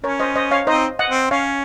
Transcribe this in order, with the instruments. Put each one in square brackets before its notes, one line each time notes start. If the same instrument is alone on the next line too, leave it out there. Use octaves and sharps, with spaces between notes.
[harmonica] C#4 [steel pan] A#4 C#5
[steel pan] C5 D#5
C5 D#5
C#5 F5
[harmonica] C4 D#4 [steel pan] C5 D#5
[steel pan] D#5 F#5
[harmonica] C4
[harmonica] C#4 [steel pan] C#5 F5